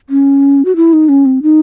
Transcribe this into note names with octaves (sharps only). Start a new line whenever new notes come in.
C#4
F#4
E4
D#4
C#4
C4
D#4